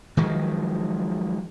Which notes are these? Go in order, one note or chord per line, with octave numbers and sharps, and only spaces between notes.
D#3 F3 F#3 G#3